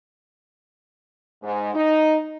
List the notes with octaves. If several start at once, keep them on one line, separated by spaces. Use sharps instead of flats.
G#2
D#4